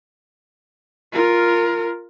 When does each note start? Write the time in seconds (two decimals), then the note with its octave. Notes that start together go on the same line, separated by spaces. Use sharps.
1.13 F4 A#4